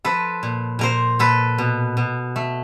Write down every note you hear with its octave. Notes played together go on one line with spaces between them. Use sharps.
F3 A4 B4
A#2
A#2 A#4 C5
A#2 A4 B4
B2
B2
A3